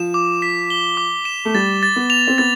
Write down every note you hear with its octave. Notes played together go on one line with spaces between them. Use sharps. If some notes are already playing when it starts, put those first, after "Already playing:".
Already playing: F3 E7
D6
B6
G7
D6
E7
A3
G3 A6
A6
B3
F7
C4
B3 A6